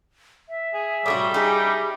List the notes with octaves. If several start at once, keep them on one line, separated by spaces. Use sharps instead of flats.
E5
G#4
A2 C3 G3 F#4 D#6
D#4 G4 G#4